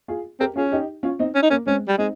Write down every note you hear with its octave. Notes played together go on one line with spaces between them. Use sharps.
F4 G#4
C4 G4 A#4
C#4 F4 G#4
D#4 G4
C#4 F4
C4 D#4
C#4
D#4
A#3 C#4
G#3 C4 C#4
G3
G#3 C4 D#4